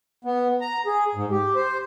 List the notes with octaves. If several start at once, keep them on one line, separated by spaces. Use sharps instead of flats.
B3
A#5
G#4
G#2
G4
C5